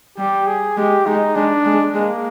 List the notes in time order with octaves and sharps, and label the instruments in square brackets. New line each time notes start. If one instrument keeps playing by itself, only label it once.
[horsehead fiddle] G3 [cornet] G4
[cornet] G#4
[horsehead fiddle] G#3 [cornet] G4
[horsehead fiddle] G#3 [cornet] D#4
[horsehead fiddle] G#3 [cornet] D4
[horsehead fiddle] G#3
[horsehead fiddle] G#3 [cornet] A#3